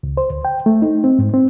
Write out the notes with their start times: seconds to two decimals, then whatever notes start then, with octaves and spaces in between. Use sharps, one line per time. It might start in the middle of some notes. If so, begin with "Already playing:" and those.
0.03 C#2
0.17 C5
0.30 D2
0.45 G5
0.66 A3
0.82 D#4
1.04 C4
1.19 G#2
1.34 C4